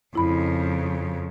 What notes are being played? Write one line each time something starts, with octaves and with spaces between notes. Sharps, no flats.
F2 C#3 E4 B5